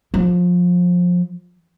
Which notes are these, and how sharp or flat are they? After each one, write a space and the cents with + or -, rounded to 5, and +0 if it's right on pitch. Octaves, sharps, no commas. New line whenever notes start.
F3 +25